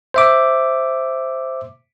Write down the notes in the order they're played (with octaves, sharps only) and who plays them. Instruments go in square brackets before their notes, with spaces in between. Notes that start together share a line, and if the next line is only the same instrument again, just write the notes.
[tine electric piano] C5 E5 D6